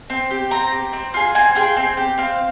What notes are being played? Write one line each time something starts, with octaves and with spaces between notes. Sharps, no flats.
C4
G4
C4 A#5
G4
C4
F4 G#4
C4 G#5
F4 G#4 G5
C4
G4
C4 F5